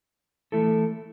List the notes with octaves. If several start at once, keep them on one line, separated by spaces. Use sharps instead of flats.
E3 A3 E4 A4